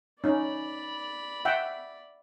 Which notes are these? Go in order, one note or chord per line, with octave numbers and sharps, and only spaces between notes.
C#4 D#4 D5 B5
E5 F#5 G5